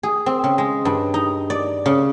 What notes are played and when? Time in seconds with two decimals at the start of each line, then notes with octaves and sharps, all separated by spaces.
0.03 G#4
0.26 C4
0.44 C#3
0.58 G#3
0.85 G2
1.14 D#4
1.50 D5
1.86 C#3